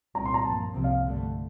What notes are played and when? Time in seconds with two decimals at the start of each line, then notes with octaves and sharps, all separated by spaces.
0.15 C2 A#2 G3 C4 A#5
0.26 C6
0.34 A#5
0.45 G2 F3 A#3 A5
0.74 C2 C3 F3 C4
0.84 F5
1.04 G2 D3 A3